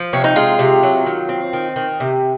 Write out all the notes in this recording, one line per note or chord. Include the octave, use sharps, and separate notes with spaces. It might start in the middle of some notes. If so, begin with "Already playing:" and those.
Already playing: F3
C3 C#4
D#4
G#3 F4
C3
F#3
D#3
C4
D#3
D#3
C3